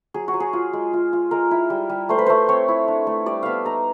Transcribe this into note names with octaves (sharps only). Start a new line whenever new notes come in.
F#3 G#4
F#4
F#3
G#4
F4
G#3
F4
F4
G#3 A#4
E4
G3
G3
A3 C5
B4
A3 C5
C4 C#5
E4
D4
A3
G3 D5
B3 E5 F5
D#4 A#5